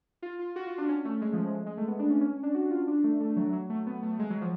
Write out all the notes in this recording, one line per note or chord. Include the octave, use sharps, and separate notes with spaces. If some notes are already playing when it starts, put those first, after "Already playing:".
F4
F4
F#4
F4
D4
C#4
A3
G#3
F3
G#3
G#3
A3
B3
D4
C#4
C#4
D4
F#4
F4
D4
A3
A3
F#3
F#3
A3
B3
A3
G#3
F#3
F3